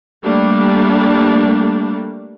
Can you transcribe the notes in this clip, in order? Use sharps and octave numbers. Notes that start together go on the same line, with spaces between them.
G3 A3 A#3 D4